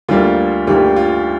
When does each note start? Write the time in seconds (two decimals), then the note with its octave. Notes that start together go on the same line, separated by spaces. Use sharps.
0.09 D2 D3 G3 A#3 F4
0.67 D2 D3 G3 A#3 G4
0.96 F4